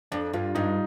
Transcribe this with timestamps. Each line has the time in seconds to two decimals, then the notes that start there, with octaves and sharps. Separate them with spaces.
0.12 F2 D4
0.34 G2 F4
0.55 G2 D#4